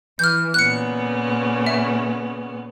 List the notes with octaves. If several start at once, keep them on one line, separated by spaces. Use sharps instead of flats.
E3 F6 G6
A#2 C#3 B3 F#6 C#7
E5